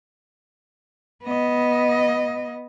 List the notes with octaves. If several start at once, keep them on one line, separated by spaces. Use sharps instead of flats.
B3 D#5